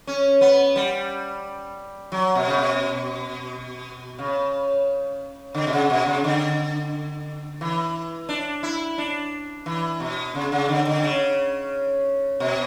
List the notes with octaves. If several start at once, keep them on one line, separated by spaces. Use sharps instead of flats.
C#4
B3
G3
F#3
B2
C#3
B2
C#3
D3
B2
C#3
B2
C#3
D3
E3
D4
E4
D4
E3
B2
C#3
C#3
D3
D3
C#3
B2